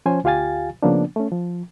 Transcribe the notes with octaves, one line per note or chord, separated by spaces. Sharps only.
F3 C#4 C5 G#5
D2 F4 G4 F5 G#5 A6
C#3 F3 A#3 B3 D4
A3 C#4
F3